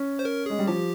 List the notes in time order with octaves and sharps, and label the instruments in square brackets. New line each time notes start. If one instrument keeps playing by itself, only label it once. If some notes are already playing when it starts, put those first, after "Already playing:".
Already playing: [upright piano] C#4
[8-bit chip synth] C5
A#4
[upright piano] G#3 [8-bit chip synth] G#4
[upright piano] G3
[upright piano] F3 [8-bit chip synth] G4